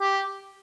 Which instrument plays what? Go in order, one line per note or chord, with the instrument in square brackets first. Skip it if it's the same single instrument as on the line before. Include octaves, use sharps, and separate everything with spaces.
[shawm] G4